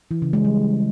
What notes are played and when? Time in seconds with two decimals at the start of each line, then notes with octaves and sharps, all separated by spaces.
0.11 E3
0.22 C#3
0.33 G#3
0.45 G3